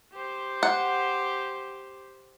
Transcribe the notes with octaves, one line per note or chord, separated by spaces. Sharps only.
G4 C5
F#5